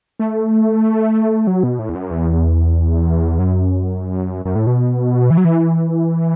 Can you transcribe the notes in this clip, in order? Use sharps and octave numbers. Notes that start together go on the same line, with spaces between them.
A3
F#3
B2
A2
E2
F#2
E2
F#2
F#2
A2
B2
E3
F#3
E3